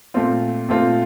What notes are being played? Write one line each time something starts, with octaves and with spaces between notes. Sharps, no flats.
A#2 A3 C4 F4
A#2 A3 C4 F4